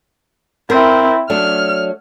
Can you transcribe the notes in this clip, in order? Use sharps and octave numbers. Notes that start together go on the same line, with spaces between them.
C4 E4 A#4
F#3 A3 D4 F6